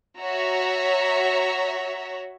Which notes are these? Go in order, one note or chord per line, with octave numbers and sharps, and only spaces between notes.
F#4 C#5 E5 A#5